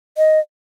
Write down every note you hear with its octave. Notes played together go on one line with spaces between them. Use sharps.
D#5